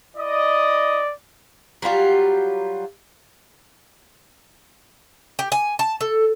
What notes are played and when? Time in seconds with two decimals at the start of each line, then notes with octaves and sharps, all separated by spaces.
0.17 E4 D5 D#5
1.82 F#3 G3 F4 G4
5.39 G4
5.52 G#5
5.79 A5
6.01 A4